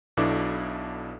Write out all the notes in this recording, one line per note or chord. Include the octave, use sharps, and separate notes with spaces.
B1 B2 D4 E4 A4 D6